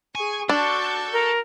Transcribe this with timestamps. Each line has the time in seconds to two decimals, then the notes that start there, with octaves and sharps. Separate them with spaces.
0.15 G#4 G#5 C#6
0.49 D4 F#4 A4 C#6 G6
1.13 A#4